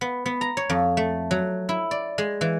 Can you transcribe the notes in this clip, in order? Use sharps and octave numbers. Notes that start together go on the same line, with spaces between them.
B3
B3
A#5
C#5
F2
A3
F#3
E4
D5
G#3
E3